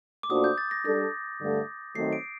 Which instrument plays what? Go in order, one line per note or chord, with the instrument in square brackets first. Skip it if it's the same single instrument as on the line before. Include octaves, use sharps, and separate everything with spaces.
[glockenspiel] D6
[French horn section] A#2 A3 D4 F#4 C5 [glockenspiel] D#6
[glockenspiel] G6
A6
A#6
[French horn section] G3 D4 A4 [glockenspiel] A#6
[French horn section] G2 D3 A3
[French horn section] D#3 F#3 A3 C4 [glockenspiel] C7
[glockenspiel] D7